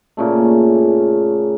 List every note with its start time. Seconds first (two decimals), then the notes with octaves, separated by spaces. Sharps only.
0.17 A#2 C#3 A3